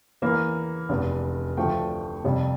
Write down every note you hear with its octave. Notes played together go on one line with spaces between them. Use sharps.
E2 E3 A#3
F1 E2 D3
D2 D3 F3 A3 G5
F2 C3 G3